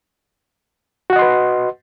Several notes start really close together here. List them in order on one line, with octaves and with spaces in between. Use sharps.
F#4 F#5 D#5 C6 B4